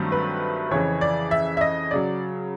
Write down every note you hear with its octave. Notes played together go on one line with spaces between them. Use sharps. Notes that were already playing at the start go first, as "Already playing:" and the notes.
Already playing: G2 D#3 F#3 A3 C4
B4
F2 C#3 E3 C#5
D5
E5
E5
D#5
C#3 F#3 D5